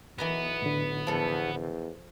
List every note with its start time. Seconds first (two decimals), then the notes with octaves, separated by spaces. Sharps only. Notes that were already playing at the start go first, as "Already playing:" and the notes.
0.18 B1 E3 B3 D#5 A#5
0.62 A2 D3
1.07 E2 F3 A4
1.55 E2